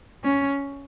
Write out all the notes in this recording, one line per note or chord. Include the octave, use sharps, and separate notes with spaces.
C#4